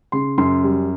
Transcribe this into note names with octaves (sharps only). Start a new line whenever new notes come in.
C#3 C6
F#2 C6
G3